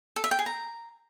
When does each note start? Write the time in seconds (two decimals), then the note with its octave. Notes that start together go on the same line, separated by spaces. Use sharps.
0.16 A4
0.24 E5
0.31 G5
0.39 G#4
0.46 A#5